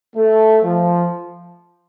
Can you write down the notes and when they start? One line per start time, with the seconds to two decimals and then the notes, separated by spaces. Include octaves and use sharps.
0.16 A3
0.63 F3